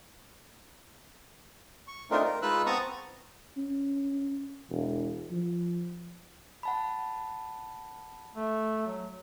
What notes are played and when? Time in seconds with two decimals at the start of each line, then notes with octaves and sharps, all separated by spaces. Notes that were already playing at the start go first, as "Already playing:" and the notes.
1.88 C#6
2.11 A3 C4 D4 D#4 F4 A#4
2.24 A#4
2.42 G#3 D#4 F4 B4 E6 F#6
2.66 B3 C4 A5 A#5 C#6 D#6
3.57 C#4
4.70 E1
5.31 F3
6.63 F#5 A5 B5
8.35 A3
8.86 F#3